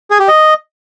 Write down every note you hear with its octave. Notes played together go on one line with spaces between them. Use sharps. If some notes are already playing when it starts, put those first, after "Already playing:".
G#4
G4
D#5